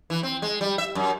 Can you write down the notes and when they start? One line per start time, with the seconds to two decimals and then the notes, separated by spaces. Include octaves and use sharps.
0.10 E3
0.23 C4
0.42 G#3
0.61 G3
0.78 E5
0.95 F#2